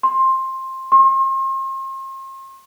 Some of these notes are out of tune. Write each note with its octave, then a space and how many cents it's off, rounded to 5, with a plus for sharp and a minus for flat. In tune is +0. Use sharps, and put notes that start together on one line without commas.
C6 +15
C6 +40